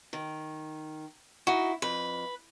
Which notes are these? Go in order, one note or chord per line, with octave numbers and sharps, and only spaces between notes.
D#3
D#4 E4 F#4
F2 B4